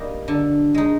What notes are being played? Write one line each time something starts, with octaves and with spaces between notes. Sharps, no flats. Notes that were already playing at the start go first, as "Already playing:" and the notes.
Already playing: G3 A#3 D#4
D3
G#3 D#4